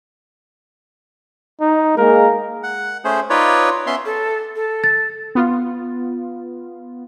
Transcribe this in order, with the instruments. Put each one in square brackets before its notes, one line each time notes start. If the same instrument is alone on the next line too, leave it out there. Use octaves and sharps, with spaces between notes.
[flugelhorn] D#4
[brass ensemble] G#3 A#3 [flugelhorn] A#4
[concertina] F#5
A3 C#4 G#4 C5
D#4 F4 B4 C#5 D5
B3 C#4 E5 C6
[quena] A4
A4
[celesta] A6
[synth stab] B3 F4